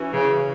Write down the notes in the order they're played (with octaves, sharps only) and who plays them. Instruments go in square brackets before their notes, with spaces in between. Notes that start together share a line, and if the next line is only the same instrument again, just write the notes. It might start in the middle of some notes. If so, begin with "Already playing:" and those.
Already playing: [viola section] E3 C#4 F#4
[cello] C#3